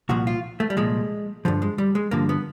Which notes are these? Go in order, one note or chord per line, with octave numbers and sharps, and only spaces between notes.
C2 A#2 F3 F#4
F4
A3
G3
C2 A#2 F3 G#3
G2 D3 F3
G#3
G3
G#3
G2 D3 F3 A#3
B3